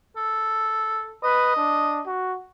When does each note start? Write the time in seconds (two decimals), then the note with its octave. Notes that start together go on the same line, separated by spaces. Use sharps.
0.17 A4
1.24 B4 D#5
1.57 D4
2.06 F#4